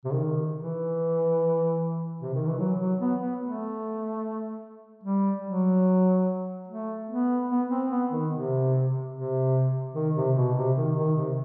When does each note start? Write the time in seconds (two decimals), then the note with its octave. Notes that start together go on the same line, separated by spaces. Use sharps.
0.05 C3
0.13 D#3
0.55 E3
2.22 C3
2.34 D#3
2.46 E3
2.59 F#3
2.80 F#3
3.00 B3
3.20 B3
3.41 A3
5.04 G3
5.45 F#3
6.68 A3
7.09 B3
7.50 B3
7.70 C4
7.90 B3
8.11 D#3
8.31 C3
9.13 C3
9.94 D#3
10.15 C3
10.36 B2
10.56 C3
10.76 D#3
10.97 D#3
11.17 C3